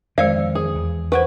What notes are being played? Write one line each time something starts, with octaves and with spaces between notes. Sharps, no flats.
F2 D#3 E3 G#3 C5 D5 F5
G#4
E2
B4 C5 F#5 C#6